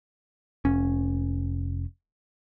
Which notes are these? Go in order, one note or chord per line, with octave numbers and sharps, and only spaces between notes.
F1 C#4